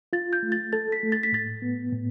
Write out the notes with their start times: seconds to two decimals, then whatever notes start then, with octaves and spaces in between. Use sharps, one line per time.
0.13 F4 A6
0.33 G6
0.43 A3
0.52 A6
0.73 A4 A6
0.92 B6
1.03 A3
1.12 A6
1.23 B6
1.32 A2 A6
1.62 B3
1.92 A2